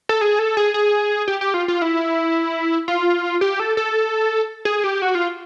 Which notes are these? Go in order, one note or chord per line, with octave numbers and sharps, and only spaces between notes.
A4
G#4
A4
G#4
G#4
G4
G4
F4
F4
E4
F4
G4
A4
A4
G#4
G4
F#4
F4